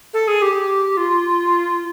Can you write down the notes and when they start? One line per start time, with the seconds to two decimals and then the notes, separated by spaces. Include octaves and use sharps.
0.13 A4
0.28 G#4
0.42 G4
0.97 F4